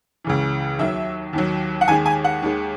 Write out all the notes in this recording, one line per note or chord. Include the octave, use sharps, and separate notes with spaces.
C#2 C#3 E3
D#2 D#3 F#3 E5
D#2 D#3 F#3
F#5
D#2 D#3 G#3 G#5
G#5
F#5
D#2 D#3 G#3